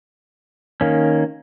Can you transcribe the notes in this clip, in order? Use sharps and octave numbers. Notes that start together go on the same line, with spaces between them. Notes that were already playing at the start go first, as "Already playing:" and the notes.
D#3 A#3 C#4